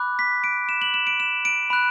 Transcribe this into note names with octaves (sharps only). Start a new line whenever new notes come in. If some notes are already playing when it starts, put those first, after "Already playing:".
Already playing: B5 D6 F#6
B6
D7
E7
F#7
E7
D7
E7
D7
B5 F#6